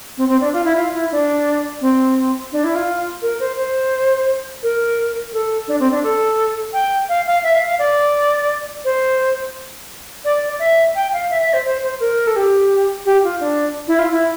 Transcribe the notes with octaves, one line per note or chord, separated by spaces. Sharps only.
C4
C4
D4
F4
E4
F4
E4
D4
C4
D4
E4
F4
A#4
C5
C5
A#4
A4
D4
C4
D4
A4
G5
F5
F5
E5
F5
F5
D5
C5
D5
E5
G5
F5
E5
E5
C5
C5
C5
A#4
A4
G4
G4
F4
D4
E4
F4
E4